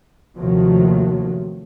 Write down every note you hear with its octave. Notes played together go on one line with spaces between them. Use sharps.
D#2 C3 D#3 F3 F#3 A3